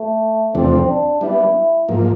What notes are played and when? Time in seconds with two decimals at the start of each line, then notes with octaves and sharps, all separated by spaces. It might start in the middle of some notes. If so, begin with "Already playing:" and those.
Already playing: A3
0.55 E2 C3 F3 A3 C4 D4
0.88 D4
1.21 G3 B3 D4 E4
1.89 G#2 F3 A#3